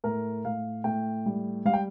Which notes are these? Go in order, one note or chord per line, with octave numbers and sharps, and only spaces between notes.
A2 A#4
A2 F5
A2 G5
G3
G3 F5
G5